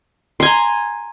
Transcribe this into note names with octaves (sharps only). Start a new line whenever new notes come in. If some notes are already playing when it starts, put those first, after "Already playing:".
G#5 A#5 C6